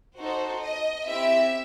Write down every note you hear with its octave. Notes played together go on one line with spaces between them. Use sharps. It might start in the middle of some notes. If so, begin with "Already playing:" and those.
D#4 F#4 A4 C5
D#5
C4 E4 G4 E5